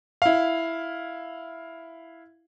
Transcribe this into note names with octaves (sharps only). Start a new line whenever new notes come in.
E4 F5